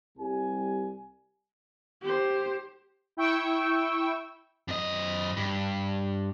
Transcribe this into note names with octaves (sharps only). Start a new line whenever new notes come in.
C2 G3 G4 G#5
G4 C5
E4 G5 C#6 E6
F#2 D#5
G2